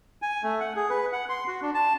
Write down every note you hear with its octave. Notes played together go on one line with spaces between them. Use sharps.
G#5
A3
F#5
G#4
B4
F#5
C6
F#4
D4
A5